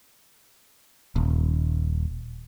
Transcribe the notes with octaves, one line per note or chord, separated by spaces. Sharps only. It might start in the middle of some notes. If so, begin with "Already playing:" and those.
D#1